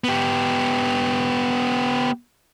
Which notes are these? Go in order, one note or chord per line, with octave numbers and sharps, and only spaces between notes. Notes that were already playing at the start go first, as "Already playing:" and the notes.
B3 G4